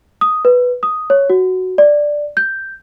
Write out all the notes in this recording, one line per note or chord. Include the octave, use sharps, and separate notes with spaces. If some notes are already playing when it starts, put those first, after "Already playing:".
D#6
B4
D#6
C#5
F#4
D5
G6